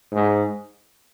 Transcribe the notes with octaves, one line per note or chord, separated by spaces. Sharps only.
G#2